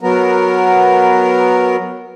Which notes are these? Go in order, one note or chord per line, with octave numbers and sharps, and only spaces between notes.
F#3 B3 A#4